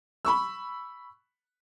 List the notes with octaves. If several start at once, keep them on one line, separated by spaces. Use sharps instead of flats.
B5 C#6 E6